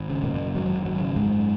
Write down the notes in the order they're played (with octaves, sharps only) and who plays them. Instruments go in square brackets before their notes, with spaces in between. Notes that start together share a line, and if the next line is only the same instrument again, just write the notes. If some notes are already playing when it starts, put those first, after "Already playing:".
Already playing: [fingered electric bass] G#1
C#3
A#2 A#3
F#2
G#1 F#3
G#1
F#3
C#3
G#2 G#3
F#2